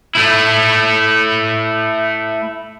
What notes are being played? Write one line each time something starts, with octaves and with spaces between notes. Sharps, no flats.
A3 E4